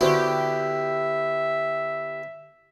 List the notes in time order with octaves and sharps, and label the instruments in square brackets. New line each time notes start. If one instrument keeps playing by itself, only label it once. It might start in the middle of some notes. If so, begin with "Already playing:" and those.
[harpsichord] D3 B3 E4 [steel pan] F#4 C5 [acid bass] G4 [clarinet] E5